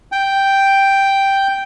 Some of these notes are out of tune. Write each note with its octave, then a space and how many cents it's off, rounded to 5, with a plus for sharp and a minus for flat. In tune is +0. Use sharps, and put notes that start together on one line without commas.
G5 +0